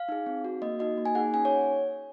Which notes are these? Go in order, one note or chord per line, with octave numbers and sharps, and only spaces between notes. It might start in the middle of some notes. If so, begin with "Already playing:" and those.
Already playing: F5
D#4 G#4
C4
F#4
A#3 D#5
D#4 F#4 D#5
A#3
G#5
D#4 G#4 F#5
C#4 G#5
C#5